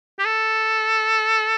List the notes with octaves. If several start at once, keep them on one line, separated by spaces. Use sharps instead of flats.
G4
A4